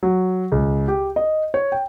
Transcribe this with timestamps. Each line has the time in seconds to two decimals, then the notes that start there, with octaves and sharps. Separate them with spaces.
0.03 F#3
0.52 C#2
0.88 G4
1.16 D#5
1.54 C#5
1.72 G5